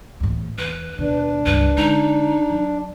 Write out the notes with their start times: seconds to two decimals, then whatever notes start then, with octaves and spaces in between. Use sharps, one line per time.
0.20 E2 A2
0.58 E2 B4
0.98 D#2 B2 D4
1.46 C#2 G2 B4
1.77 D3 G#3 D#4
2.50 F#3